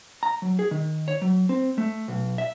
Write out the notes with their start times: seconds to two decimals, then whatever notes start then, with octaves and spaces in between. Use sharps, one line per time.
0.23 A#5
0.42 F#3
0.59 G#4
0.71 D#3
1.08 C#5
1.22 F#3
1.49 C4
1.78 A3
2.08 B1
2.38 E5